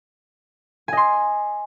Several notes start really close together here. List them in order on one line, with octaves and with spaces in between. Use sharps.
G#5 D#5 C6